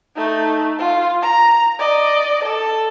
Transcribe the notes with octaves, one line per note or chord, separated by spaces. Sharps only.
A3 D#4
F4
A#5
D5 D#5
A4